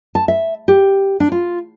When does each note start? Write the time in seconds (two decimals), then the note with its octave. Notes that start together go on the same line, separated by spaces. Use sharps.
0.15 A5
0.28 E5
0.68 G4
1.20 D4
1.32 F4